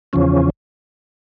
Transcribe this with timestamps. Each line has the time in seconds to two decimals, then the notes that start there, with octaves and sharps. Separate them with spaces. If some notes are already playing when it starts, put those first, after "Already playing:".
0.13 E2 C#3 F3 C#4